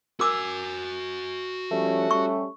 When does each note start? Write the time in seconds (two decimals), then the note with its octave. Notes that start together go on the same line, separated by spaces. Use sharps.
0.20 F#4 A#4 G#5 D6 E6
1.71 F3 G3 A3 C#4
2.11 G3 C#4 C#6